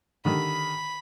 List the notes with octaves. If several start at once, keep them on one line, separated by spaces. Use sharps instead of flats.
D3 D#3 G3 B5